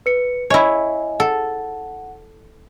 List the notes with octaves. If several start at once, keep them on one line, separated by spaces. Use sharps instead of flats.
B4 C#7
E4 C#5 D#5 G#5
A4 F#5